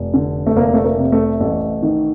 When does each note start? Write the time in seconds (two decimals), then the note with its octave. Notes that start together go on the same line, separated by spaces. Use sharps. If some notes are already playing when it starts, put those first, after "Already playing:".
Already playing: F1
0.14 D3
0.47 A3
0.56 F1 A#3
0.74 A3
0.84 A#3
0.98 C3
1.12 A3
1.40 A1 A3
1.83 D#3